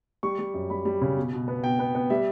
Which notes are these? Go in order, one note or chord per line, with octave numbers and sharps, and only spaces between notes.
G3 C#6
G3
F#2
G3 B5
G3
C#3
B2
B2
B3
B2 G5
B3
B3
G3 E5